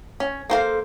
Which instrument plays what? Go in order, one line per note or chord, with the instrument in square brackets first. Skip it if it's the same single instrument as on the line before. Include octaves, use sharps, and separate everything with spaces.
[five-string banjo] C#4
[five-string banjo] A#3 C5 F5 [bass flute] A4